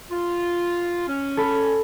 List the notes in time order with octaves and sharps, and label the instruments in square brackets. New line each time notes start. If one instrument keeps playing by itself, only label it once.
[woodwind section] F4
C#4
[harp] A4 B5